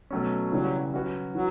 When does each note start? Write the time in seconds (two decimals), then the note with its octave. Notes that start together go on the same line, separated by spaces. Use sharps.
0.11 B2 F#3 A3 C#4
0.52 C#3 E3 F#3 G3
0.93 F#3 C#4 F#4 B4
1.34 E3 F#3